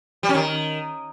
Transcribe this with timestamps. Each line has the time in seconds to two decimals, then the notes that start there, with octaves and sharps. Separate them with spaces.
0.23 G3
0.29 C#4
0.35 D#3